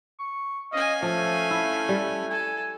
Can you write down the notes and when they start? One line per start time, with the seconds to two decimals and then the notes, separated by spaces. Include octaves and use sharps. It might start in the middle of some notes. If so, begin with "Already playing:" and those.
0.19 C#6
0.73 C#4 D#5 F5 G#5
1.02 F3 A3
1.51 E4
1.89 G3
2.30 A4 G#5